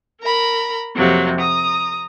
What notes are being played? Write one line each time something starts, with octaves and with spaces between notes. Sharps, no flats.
A#4 A#5 B5
F2 C3 F#3 A#3
A#5 D#6